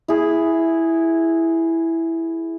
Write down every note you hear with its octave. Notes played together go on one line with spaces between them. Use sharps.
E4 G#4